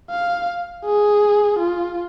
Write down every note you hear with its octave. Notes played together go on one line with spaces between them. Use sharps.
F5
G#4
F4